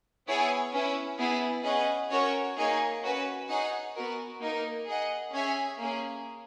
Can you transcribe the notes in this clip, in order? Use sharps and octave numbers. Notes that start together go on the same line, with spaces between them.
B3 E4 G#4 C#5 G#5
C#4 E4 B4
B3 E4 G#4
C#4 G#4 B4 D#5 F#5
C#4 F#4 A#4 C#5
A#3 D#4 G#4 C#5 G#5
C#4 F#4 B4
D#4 G#4 C#5 F#5
B3 F#4 A#4
A#3 D#4 A#4
G#4 D#5 F#5
C#4 G#4 C#5 E5 G#5
A#3 C#4 G#4